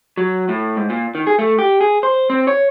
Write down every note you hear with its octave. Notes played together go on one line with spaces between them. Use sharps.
F#3
A2
G#2
A#2
D#3
G#4
A3
G4
G#4
C5
C4
C#5